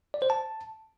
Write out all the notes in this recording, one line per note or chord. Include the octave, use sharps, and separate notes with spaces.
D5
C5
A5